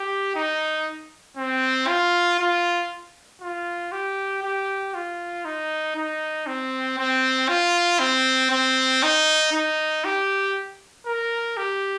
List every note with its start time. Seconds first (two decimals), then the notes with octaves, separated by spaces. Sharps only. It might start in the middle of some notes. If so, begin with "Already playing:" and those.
Already playing: G4
0.35 D#4
1.37 C4
1.88 F4
2.39 F4
3.41 F4
3.92 G4
4.43 G4
4.94 F4
5.45 D#4
5.96 D#4
6.47 C4
6.98 C4
7.49 F4
8.00 C4
8.51 C4
9.03 D#4
9.53 D#4
10.05 G4
11.06 A#4
11.57 G4